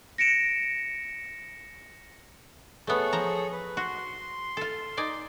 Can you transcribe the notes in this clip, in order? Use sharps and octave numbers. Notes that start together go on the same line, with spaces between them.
A#6 C#7 D7 E7
A3 B3 G#4 A4 C#5
F3 A#5
B4
F#4 C6
F4 A4
D#4 D5 G#5